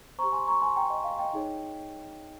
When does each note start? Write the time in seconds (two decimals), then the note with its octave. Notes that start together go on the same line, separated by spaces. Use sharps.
0.18 G4 C5 A#5 C#6
0.32 G#5 C6
0.48 A#5 C#6
0.61 G#5 C6
0.76 G5 A#5
0.90 D#5
1.04 F5
1.19 D#5 G5
1.33 D#4 G#4 C#5